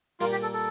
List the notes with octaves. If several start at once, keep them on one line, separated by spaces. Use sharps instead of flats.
A#2 G3 A#3 F4
G4
A4
A4